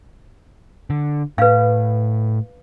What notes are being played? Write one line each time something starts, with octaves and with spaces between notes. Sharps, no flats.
D3
A2 B4 F5